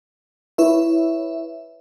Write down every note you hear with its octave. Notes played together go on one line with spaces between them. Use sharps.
E4 B4 C#5 E5